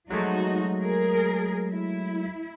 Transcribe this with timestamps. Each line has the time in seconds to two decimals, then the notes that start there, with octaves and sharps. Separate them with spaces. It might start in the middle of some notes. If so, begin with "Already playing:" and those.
0.10 F3 F#3 G#3 A3 D#4 F#4
0.82 G#4 A#4
1.69 E4